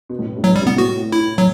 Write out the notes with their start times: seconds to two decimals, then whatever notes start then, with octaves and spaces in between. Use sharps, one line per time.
0.10 B2
0.19 A2
0.27 B2
0.36 G2
0.44 A2 F#3
0.56 G3
0.61 C3
0.67 B3
0.78 A2 F#4
1.12 E4
1.38 F#3